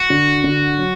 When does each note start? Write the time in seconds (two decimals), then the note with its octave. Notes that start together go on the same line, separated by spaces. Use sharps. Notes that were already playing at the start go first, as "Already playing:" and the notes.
Already playing: F#4
0.10 D3
0.44 D3
0.77 F#3